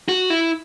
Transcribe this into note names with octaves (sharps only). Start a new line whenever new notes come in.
F#4
E4